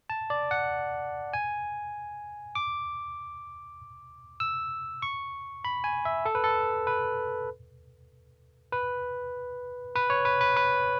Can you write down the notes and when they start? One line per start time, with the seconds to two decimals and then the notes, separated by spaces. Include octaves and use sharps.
0.10 A5
0.30 D5
0.51 F#5
1.34 G#5
2.55 D6
4.40 E6
5.02 C#6
5.65 B5
5.84 G#5
6.05 E5
6.26 A4
6.35 B4
6.44 A4
6.87 B4
8.72 B4
9.96 B4
10.10 C#5
10.25 B4
10.41 B4
10.57 B4